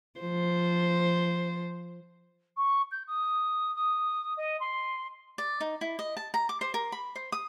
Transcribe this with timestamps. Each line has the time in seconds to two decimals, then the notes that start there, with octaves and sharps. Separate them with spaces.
0.20 F3 C5
2.57 C#6
2.91 G6
3.07 D#6
3.75 D#6
4.37 D#5
4.60 C6
5.38 D5
5.60 D#4
5.81 E4
5.99 D#5
6.17 A5
6.34 A#5
6.49 D6
6.61 C5
6.74 A#4
6.92 B5
7.16 C5
7.32 D#6